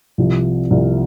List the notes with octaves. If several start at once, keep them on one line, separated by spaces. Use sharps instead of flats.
C2 C3 F3
C2 C3 F3